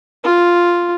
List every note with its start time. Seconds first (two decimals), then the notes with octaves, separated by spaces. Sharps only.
0.24 F4